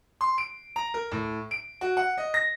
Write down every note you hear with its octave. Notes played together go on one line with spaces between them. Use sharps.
C6
D7
A#5
A#4
A2
D7
F#4
F#5
D#5
A#6